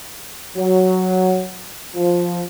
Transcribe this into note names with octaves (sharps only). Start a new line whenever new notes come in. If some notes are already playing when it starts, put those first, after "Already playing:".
F#3
F3